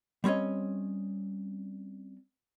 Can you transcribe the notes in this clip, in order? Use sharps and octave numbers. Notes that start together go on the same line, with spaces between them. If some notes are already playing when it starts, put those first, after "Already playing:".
G3 C4 C#4 C#5 D#5